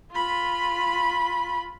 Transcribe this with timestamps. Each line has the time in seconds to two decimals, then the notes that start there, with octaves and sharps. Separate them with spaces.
0.12 F4 B5